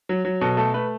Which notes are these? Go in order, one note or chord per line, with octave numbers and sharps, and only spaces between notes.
F#3
F#3
B2 A4
A3 A4
A3 B4